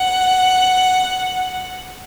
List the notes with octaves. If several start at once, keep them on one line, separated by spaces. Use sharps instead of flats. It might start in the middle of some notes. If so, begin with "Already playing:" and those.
Already playing: F#5